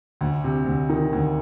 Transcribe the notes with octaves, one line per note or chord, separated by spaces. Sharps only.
D2
C3
D2
D#3
D2